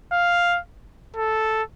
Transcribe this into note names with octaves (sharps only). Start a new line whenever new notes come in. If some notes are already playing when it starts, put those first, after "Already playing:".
F5
A4